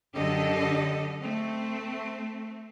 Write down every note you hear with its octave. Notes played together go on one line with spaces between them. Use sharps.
F#2 D3 G4 A4 D#5
A3 C4